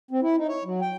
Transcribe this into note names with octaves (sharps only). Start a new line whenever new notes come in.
C4
E4
D#4
C#5
F#3
G5